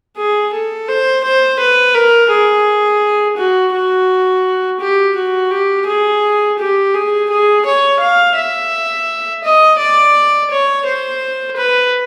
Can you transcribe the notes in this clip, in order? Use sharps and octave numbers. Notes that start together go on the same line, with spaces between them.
G#4
A4
C5
C5
B4
A#4
G#4
F#4
F#4
G4
F#4
G4
G#4
G4
G#4
G#4
C#5
F5
E5
D#5
D5
C#5
C5
B4